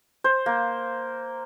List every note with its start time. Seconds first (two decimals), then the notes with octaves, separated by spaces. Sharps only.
0.24 C5
0.46 A#3